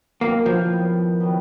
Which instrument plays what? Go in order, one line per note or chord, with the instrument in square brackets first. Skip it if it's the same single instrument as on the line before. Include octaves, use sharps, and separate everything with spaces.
[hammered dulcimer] D#3 F#3 B3 E4 [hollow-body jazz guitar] A#3
[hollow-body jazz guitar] F3
[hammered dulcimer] D#3 F#3 B3 E4
D#3 F#3 B3 E4